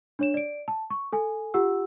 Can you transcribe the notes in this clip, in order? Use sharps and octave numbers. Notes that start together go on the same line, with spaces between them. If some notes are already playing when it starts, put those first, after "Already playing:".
D4 C#5 E7
D5 D7
A5
C#6
A4 G#5
F4 G4 F#5 E6